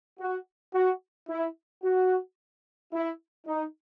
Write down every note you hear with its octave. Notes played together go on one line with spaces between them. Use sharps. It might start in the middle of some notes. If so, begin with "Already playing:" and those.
F#4
F#4
E4
F#4
E4
D#4